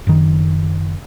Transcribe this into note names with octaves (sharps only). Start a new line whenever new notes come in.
F#1 D#3